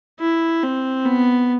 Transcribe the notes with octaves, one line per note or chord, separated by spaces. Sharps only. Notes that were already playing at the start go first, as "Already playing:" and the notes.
E4
C4
B3